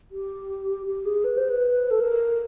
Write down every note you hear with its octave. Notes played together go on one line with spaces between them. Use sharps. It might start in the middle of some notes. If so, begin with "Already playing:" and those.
G4
G4
G#4
B4
C5
B4
A4
A#4